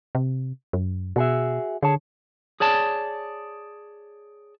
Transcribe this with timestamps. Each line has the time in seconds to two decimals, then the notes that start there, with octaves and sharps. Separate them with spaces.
0.15 C3
0.73 F#2
1.16 B2 F#4 G#4 E5
1.83 D3 G#4 C#5 A5
2.60 G#4 C#5 D5 A5